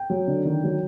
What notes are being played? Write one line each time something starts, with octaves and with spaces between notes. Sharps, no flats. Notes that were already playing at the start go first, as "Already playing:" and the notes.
Already playing: G5
F#3
D3
D#3
F#3